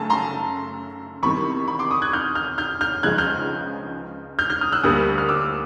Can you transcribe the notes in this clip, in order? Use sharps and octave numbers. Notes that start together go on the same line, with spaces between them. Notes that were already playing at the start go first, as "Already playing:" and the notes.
Already playing: F#2 C#3 A3 G#5 A5
A#5 C6
E2 C3 D#3 B5 C#6
B5 C#6
C6 D6
C#6 D#6
F#6 G#6
F6 G6
F6 G6
F6 G6
F6 G6
C#2 C#3 F3 G#3 F#6 G#6
F6 G6
F6 G6
F6 G6
D#6 F6
E6 F#6
D2 D3 G3 A#3 D#6 F6
F6
D6 E6